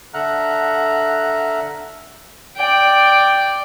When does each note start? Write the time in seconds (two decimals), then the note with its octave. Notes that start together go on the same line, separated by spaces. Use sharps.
0.14 D3 E5 F#5 A#5 F6 F#6
2.56 D5 G5